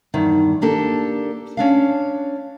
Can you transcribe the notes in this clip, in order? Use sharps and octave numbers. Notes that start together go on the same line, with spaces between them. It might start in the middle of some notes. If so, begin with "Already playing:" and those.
E2 G2 D#3
A#3 D4 G4 A4
C#4 D4 F5